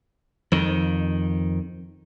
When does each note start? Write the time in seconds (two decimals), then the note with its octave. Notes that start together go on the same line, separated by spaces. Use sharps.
0.52 F2 D#3